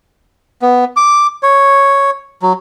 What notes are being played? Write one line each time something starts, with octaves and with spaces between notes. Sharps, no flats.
B3
D6
C#5
F#3